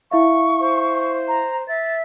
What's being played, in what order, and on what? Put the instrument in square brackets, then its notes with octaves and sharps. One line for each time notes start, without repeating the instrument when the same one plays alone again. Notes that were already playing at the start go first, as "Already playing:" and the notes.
[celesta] E4 E5 F5 [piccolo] C#6
[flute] C5
[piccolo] A#5
[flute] E5 [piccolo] A6